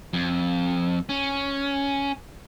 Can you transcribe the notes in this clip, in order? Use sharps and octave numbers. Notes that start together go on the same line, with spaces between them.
F2
C#4